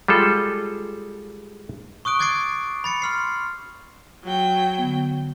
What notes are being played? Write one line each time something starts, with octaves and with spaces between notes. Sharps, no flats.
G3 G#3 F4 A4
C#6 D#6 F#6 D7
D6 F#6 G#6 A6 C7 D7
B5 A6 C#7
C6 F6 C7
F#3 G5
D3 B3